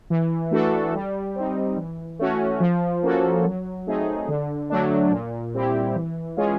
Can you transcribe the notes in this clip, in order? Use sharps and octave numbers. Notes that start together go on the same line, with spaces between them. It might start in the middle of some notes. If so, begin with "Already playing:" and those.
E3
A3 D4 F#4 A4
G3
C4 D#4
E3
A3 C#4 F#4
F3
A#3 C#4 F#4 A4
F#3
A3 C4 D#4 G#4
D3
F#3 A3 D4
A#2
G3 C4 E4 G4
E3
G#3 C#4 F4 G#4